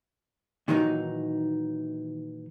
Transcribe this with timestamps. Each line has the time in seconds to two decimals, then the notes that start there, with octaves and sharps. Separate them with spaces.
0.68 A#2 D#3 E3 F#3 D#4